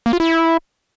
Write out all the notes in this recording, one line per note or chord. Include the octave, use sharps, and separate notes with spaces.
A#3
F4
E4